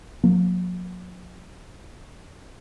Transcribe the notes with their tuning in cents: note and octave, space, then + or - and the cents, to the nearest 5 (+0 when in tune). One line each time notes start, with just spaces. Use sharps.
F#3 -40 A#3 +0